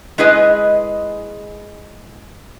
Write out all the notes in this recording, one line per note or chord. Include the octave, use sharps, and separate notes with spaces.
G#3 E4 G#4 B4 D#5